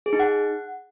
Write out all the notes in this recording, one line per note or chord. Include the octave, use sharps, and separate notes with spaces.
G#4
D#4
F#5